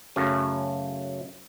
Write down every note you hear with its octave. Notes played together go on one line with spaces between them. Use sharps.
F#2 C#3 F#3 A3 C#4